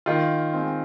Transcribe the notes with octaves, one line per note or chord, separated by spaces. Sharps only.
D#3 F4
G#3 C4